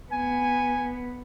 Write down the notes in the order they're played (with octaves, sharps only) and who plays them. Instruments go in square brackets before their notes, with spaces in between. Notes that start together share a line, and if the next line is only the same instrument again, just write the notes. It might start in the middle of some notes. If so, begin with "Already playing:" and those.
[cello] B3 [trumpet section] G#5